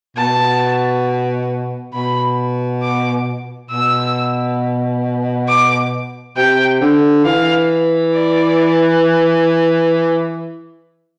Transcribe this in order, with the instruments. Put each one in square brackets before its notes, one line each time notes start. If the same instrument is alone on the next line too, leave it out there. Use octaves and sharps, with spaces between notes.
[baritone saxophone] B2 [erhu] A5
[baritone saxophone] B2 [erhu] B5
[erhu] D6
[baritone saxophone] B2 [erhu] E6
[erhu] D6
[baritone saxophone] C3 [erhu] G5
[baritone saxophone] D3
[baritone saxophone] E3 [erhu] F5
[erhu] D5